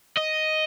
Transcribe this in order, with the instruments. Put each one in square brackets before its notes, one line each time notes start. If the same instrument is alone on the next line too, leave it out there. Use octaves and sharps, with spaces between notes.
[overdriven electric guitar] D#5